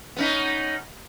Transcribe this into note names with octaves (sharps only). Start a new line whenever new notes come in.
B3 C#4 D#4